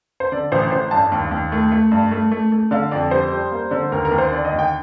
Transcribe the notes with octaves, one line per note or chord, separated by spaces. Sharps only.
C5
D3 D5
A1 C5
A1 C5
G2 A5
D#2
D#2
A3
A3
G2
A3
A3
A3
D3 F5
F2 D5
G3 C5
G3
A#3
D3
D#2 A#4
A#4
D#2
C5
D3 D5
D#5
D#2
G5